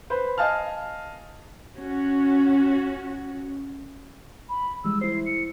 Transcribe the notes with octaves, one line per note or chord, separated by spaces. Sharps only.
B4 C5
D#5 F5 G#5 A5 F6
C#4 F#4
B5
E3 G3 G#3 E6
E4 C5 C7
C#7